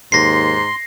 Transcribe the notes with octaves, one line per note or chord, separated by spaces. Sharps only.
D#2 G#2 C6 A#6 C7